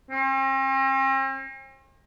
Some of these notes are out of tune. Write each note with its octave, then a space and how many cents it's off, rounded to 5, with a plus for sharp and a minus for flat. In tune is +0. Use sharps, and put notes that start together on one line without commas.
C4 +45